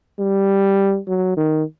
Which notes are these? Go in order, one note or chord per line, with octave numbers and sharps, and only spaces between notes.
G3
F#3
D#3